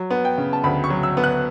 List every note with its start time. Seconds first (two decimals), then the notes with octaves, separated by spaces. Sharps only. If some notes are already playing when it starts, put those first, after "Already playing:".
Already playing: F#3
0.10 B3
0.25 G5
0.38 C#3
0.53 A5
0.64 D2 B5
0.84 C#6
0.90 F#3
1.03 E6
1.17 B3
1.24 F#6